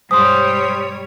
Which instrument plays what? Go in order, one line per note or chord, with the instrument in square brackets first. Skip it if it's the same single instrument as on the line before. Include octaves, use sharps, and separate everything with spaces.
[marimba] G2 B2 G#3 [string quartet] G3 C#5 [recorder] C5 [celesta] C6 D#6